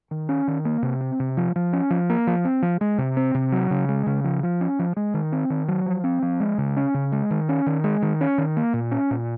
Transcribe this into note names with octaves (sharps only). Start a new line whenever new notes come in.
D#3
C#4
D#3
A#3
C3
C4
C3
F3
F3
C#4
F3
A#3
F3
C4
F3
G#3
C3
C4
C3
F#3
C#3
G#3
C#3
F3
F3
C#4
F3
G#3
D#3
C4
D#3
F#3
F3
C4
F3
G#3
C#3
C#4
C#3
G#3
D#3
C#4
D#3
G#3
D#3
C#4
D#3
A#3
A#2
C#4
A#2